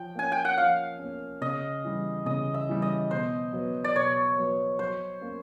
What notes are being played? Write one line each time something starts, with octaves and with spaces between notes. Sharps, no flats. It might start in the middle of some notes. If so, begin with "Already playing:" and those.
Already playing: F3 G5
A#3 C#4 G#5
G5
F#5
F3 F5
A#3 C#4
C#3 D#5
E3 G3
C#3 D#5
E5
E3 G3
D#5
B2 C5
F#3 B3
D5
B2 C#5
F#3 B3
F#3 C5
A#3 C#4